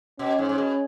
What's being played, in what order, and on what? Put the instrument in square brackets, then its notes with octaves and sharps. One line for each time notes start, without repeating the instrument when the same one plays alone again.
[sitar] B2 [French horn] C#4
[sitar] G#2
G#2
B2